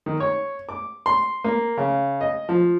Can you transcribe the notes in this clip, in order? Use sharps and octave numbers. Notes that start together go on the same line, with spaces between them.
D#3
C#5
D6
C6
A#3
C#3
D#5
F3